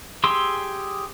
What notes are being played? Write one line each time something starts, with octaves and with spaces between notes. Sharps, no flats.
G4 G#4 C6 E6